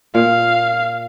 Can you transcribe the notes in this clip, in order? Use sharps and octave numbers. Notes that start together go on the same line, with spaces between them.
A#2 F5